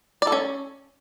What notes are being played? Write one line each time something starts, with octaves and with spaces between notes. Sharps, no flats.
D5
A4
C#4